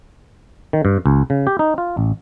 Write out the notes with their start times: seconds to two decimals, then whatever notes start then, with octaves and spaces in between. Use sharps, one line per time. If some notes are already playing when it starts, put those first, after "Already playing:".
0.73 D#3
0.85 G2
1.06 C#2
1.30 C#3
1.47 G4
1.59 D#4
1.78 F4
1.97 A1